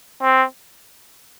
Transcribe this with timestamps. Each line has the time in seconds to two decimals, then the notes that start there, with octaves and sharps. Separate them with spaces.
0.22 C4